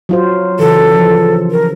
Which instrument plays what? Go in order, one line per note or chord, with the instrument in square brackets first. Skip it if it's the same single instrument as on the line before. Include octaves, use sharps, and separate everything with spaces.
[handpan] F#3 F4 C5
[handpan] C#3 E3 [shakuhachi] A4
[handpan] F3
[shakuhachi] A#4